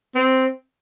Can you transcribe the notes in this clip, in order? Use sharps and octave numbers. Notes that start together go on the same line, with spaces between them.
C4